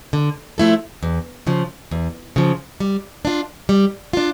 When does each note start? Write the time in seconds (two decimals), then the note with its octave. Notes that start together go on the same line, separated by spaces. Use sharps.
0.13 D3
0.58 F3 A3 E4 A4
1.03 E2
1.47 C#3 F3
1.91 E2
2.36 C#3 F3
2.80 G3
3.25 D4 F4
3.69 G3
4.13 D4 F4